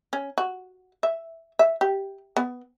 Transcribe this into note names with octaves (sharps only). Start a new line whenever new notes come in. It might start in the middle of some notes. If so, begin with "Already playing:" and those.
C#4
F#4
E5
E5
G4
B3